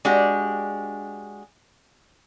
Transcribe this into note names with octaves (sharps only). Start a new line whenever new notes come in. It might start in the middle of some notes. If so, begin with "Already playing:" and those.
G#3 D4 F#4 G4